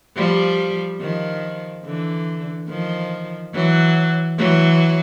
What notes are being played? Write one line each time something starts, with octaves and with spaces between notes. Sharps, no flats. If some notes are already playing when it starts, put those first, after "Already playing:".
F3 G3
D#3 F3
D3 E3
D#3 F3
E3 F#3
E3 F#3